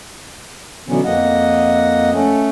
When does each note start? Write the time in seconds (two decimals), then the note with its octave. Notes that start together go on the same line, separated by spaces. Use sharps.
0.88 B2 D3 E3 F#3 B3 C#4
1.05 F2 A#3 D#5 F#5
2.13 A3 C#4